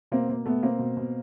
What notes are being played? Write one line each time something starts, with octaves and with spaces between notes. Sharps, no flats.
B2 A#3 C4
B2 A#3
B2 A3 B3
B2 A#3 C4
B2
B2